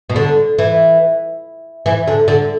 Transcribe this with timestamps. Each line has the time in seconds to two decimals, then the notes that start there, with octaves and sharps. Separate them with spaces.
0.10 B2
0.16 D3
0.59 E3
1.86 E3
2.07 D3
2.28 D3